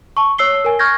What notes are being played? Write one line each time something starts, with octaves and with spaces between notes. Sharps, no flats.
A5 C#6
C#5 E6 C7 G7
A#4 G#5
C#6 F6 G6 G#6 A#6